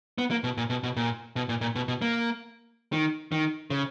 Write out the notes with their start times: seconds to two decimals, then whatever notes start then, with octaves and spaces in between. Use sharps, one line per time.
0.18 B3
0.31 A#3
0.44 B2
0.57 A#2
0.70 B2
0.83 B2
0.96 A#2
1.36 B2
1.49 A#2
1.61 A#2
1.75 B2
1.88 B2
2.02 A#3
2.93 D#3
3.32 D#3
3.70 C#3